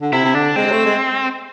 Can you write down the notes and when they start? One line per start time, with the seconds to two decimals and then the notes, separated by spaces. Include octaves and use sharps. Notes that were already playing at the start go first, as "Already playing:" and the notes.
0.01 D3
0.12 C3 E4
0.25 C3
0.34 D3 D4
0.56 G#3 C4
0.66 G#3
0.72 A3
0.86 G#3